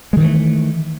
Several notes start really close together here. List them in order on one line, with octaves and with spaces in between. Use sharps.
G#3 D#3 E3 A3